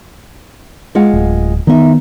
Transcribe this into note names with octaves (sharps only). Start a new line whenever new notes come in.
G#3 F4 F#5
D1
D#3 B3 D#4 E5